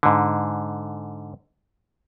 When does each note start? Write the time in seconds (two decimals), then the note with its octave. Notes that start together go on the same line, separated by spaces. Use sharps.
0.03 G#2 D3